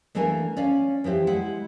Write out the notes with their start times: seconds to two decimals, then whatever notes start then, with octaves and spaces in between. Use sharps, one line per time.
0.15 E3 A3 A#3 D4 A#4 G#5
0.57 C#4 C#5 D5 F5
1.04 E3 F3 E4 G4
1.27 G#3 E4 F#5